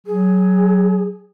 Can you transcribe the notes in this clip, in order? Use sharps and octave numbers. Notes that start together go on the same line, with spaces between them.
F#3 G#4